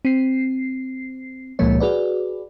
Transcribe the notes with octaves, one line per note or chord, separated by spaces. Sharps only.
C4 C7
C#2 A#2 F3 G#3 A#3 C#5
F#4 G#4 B4 D5